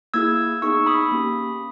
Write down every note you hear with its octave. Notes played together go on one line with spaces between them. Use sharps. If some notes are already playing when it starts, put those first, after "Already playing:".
A#3 E4 G#4 E6 G#6
B3 D#4 G#4 C#6 E6
B5 D#6
A#3 C#4 G4